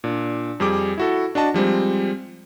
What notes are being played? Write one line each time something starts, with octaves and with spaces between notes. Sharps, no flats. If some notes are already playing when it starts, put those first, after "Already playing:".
A#2 D4
F2 G3 G#4 D6
E4 F#4 A4
D4 F#4 D#5 A5
F3 G3 G#3 C4